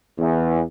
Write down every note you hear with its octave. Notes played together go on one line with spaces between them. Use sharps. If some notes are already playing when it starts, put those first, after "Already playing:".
E2